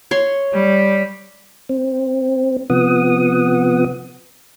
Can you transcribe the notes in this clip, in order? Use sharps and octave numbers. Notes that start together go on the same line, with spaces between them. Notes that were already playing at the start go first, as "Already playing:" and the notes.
C#5 C6
G3
C4
C3 F3 B3 F#5 D#6